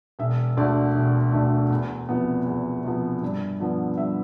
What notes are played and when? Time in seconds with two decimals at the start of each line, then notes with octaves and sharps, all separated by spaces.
0.19 E1 E5
0.57 D2 D3 A3 D5
0.95 E1
1.32 D2 D3 A3
1.70 E2
2.09 C3 F3 B3
2.46 E2
2.84 C3 F3 B3
3.22 G2
3.60 D3 F3 B3
3.97 G2 E5